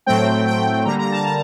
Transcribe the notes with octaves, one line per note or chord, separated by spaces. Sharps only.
A2 F#3 A3 C4 G5
G5
D3 G3 A#3 A#5
A#5
A5
A5